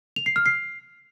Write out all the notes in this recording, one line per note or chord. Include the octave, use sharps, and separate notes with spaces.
F7
C7
F6
C7